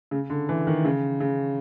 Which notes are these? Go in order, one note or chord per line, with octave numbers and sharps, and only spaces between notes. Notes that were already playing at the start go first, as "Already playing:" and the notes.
C#3
D3
E3
D#3
C#3
C#3